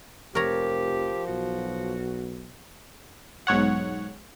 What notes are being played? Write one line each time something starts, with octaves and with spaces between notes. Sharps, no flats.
F1 F3 G4 A#4 C#5 A#5
B1 F#4
B1 G#2 C#5 F#5